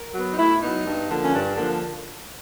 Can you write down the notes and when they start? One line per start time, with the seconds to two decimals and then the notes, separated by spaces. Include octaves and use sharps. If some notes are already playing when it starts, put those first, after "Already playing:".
Already playing: A#4
0.15 F#3 B3
0.33 D#4
0.38 A2 E4
0.62 F#3 B3 D#4
0.86 G2
1.09 D3 F3 A#3
1.24 C#4
1.33 G2 D4
1.56 D3 F3 A#3